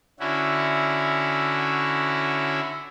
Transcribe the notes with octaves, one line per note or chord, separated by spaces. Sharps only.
D3 C#4 E4 F#4